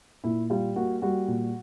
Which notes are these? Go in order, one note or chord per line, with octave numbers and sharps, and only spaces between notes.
A#2 E4
G3 F4
A#3 F#4
G3 F#4
A#2